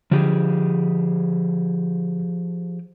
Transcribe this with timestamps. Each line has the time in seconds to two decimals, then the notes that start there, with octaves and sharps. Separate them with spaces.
0.11 D3 F3 G4 G#4